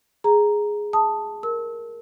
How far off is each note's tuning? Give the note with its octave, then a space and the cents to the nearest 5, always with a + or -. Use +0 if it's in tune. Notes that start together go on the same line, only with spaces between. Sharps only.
G#4 +0 A#5 +0
A5 +0 D#6 +0
A#4 +0 E6 -30